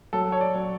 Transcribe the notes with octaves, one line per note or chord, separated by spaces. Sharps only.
F#3 A4
C#5
D5
F#3